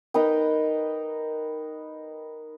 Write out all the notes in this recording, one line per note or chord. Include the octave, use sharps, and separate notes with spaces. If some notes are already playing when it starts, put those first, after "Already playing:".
D#4 A#4 B4 G5